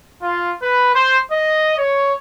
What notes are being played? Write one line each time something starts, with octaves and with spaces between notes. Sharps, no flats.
F4
B4
C5
D#5
C#5